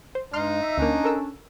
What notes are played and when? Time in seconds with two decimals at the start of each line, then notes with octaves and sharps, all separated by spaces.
0.15 C5
0.33 G2 G#3 D#4 C6 F6
0.62 E5
0.78 D2 A#3 C#4 D4
1.04 A4 A#4 E6